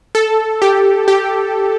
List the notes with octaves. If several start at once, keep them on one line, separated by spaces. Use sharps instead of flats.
A4
G4
G4